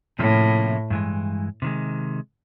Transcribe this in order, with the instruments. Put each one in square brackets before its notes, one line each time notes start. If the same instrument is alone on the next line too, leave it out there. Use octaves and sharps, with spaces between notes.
[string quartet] A2 [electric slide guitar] C3 F3 A#3 C#4 E4
[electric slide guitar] G2 E3 G#3
C3 D#3 G#3